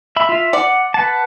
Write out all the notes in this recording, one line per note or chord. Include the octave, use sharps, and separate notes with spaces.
E5 B5
F4 E5
D5 F#5
B4 F#5 A5